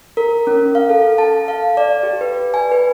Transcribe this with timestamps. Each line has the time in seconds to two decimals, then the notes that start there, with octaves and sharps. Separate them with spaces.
0.17 A#4
0.47 C#4
0.75 F5
0.89 A4
1.18 A5
1.48 F5
1.77 D5
2.03 G4
2.21 B4
2.54 G#5
2.72 B4